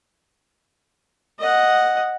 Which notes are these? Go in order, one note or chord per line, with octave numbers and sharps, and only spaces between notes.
D#5 F#5